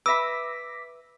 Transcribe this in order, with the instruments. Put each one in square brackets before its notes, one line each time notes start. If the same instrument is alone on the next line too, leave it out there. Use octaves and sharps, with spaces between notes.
[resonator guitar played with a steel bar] B4 E5 [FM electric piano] D6 A#6 B6 [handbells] E6